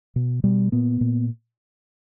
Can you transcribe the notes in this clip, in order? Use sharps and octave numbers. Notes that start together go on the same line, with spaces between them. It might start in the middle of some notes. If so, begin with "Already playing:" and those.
B2
B2 G3
A#2 B3
A#2